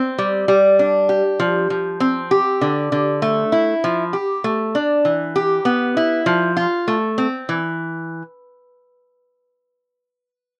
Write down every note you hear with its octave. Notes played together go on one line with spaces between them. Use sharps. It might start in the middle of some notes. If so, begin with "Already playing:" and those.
Already playing: C4
G3
G3
D4
G4
F3
F3
C4
G4
D3
D3
A3
E4
F3
G4
A3
D4
E3
G4
B3
E4
F3
F4
A3
C4
E3